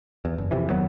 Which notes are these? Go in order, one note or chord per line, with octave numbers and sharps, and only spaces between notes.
E2
F#1
F2 C3 E3
D#1 D#3 F#3 B3